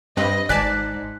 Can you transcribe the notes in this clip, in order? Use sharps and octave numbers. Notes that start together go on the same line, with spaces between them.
G2 C4 B4 D#5
G#1 G#2 D5 G#5 A5 F#6 B6